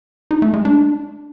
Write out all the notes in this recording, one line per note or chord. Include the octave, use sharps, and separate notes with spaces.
D#4
A3
G#3
D4